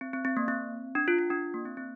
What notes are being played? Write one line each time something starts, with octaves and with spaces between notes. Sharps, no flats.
C4
C4
C4
A#3
C4
D4
F4
F4
D4
A#3
C4
C4